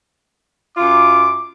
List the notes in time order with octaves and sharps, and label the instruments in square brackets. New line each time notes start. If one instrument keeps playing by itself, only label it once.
[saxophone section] F#2 F4 [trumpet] D6